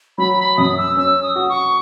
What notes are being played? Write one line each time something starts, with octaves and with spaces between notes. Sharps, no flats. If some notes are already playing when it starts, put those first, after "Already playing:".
F#3 B5
B5
F#2 D#6
D#6
E6
C#4 E6
D#6
F#4
C#6